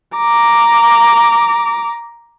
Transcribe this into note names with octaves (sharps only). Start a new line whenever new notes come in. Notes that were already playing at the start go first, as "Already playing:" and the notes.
A#5 D6